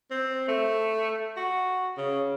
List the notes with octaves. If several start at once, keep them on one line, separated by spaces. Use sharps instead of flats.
C4
A3
F#4
C#3